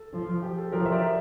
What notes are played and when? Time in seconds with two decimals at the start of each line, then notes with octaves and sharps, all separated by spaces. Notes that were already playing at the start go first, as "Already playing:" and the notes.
Already playing: A4
0.14 F3
0.43 G4
0.58 A4
0.72 F3 G4 A#4
0.86 E5
0.92 A#4 D5
1.02 C5 E5